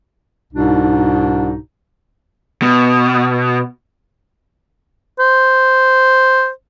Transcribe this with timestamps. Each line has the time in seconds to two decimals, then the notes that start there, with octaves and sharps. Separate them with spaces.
0.53 C2 G#2 B2 D4 D#4
2.62 B2
5.20 C5